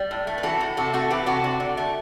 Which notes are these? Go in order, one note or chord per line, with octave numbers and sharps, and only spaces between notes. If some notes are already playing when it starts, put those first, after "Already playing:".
Already playing: G3
A2
A3
B4
E3 F#4 A4
A2
C3 F#4 A4
A3 F#4 A4
E3 G4 B4
C3 F#4 A4
D3
D3
A3